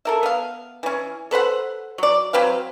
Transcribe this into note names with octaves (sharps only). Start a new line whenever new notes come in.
A4 A#4 E5
B3 F5
E3 C#4
A4 B4 C5 F#5
F#3 D5
F#3 C4 B4 F5